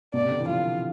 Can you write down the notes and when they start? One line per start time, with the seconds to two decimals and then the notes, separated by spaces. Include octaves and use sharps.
0.14 B2 D5
0.23 C3
0.31 D3
0.40 E3
0.48 F3 F4